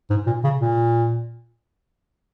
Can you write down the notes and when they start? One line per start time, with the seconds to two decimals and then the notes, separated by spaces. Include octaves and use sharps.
0.10 G#2
0.27 A#2
0.44 C#3
0.61 A#2